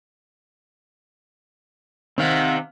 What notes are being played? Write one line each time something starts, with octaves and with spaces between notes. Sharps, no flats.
C3 D#3 C4 F5 F#5